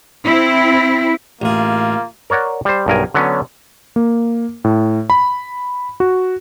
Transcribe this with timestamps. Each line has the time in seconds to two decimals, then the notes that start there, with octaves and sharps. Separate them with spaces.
0.25 C4 E4
1.42 A1 A#3 F4 G#4
2.30 A#4 C#5 D5 F#5
2.65 G3 C5
2.86 B1 G2 A#4 G#5
3.15 D3 F#3 B3 C#4
3.96 A#3
4.64 A2
5.10 B5
6.00 F#4